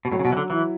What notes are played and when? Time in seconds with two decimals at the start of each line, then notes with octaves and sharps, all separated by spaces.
0.05 B2
0.11 A2 F#3
0.19 C#3
0.25 B2
0.30 E3 F#3
0.37 D3
0.50 E3 E4